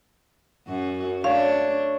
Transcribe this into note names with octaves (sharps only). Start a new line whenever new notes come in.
F#2 F#4
A3 D4 C#5 F5